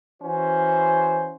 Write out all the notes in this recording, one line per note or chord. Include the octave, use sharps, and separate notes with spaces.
E3 C#4 F#4 C5